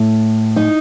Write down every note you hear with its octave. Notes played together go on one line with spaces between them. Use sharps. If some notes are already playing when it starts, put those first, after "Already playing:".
Already playing: A2
D#4